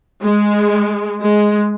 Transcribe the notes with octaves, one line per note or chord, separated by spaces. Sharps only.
G#3
G#3